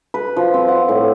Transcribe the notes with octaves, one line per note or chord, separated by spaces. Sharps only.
B4
F3
C4
F#5
A2